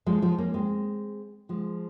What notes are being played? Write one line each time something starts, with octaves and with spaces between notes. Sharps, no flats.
F3 G#3
F3 G#3
A#3 C#4
G#3 C4
F3 G#3